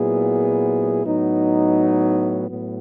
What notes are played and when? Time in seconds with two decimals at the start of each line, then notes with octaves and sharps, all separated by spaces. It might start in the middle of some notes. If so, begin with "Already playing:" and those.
Already playing: A#2 F#3 B3 E4 G#4
1.03 A2 F#3 B3 D#4
2.48 A2 F#3 B3